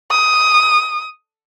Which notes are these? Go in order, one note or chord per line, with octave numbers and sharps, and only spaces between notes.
D#6